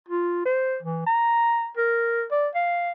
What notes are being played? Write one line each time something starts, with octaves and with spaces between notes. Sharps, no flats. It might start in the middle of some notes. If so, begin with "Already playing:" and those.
F4
C5
E3
A#5
A#4
D5
F5